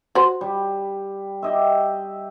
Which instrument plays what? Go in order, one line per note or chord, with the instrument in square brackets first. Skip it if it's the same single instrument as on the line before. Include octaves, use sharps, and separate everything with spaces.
[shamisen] F#4 C5
[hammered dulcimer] G3
G4 D#5 E5